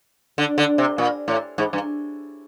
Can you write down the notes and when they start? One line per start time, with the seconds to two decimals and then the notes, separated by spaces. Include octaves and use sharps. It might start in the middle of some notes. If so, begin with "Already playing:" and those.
0.38 D3
0.58 D3
0.78 C3
0.98 A#2
1.28 A2
1.58 G#2
1.73 G2